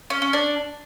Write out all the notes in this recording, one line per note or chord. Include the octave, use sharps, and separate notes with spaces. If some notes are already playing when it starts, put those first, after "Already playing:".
C#4
C#4
D4